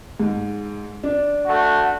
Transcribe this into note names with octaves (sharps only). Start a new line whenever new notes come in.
G#2
D4
A3 F#4